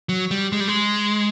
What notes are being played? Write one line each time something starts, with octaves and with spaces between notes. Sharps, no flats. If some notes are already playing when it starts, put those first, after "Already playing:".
F#3
G3
G#3
G3
G#3